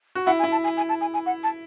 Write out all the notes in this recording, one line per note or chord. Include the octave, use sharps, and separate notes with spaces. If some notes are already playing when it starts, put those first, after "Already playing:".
F#4
E4 F#5
G#5
E4
A5
G#5
G#5
A5
G#5
G#5
F#5
A5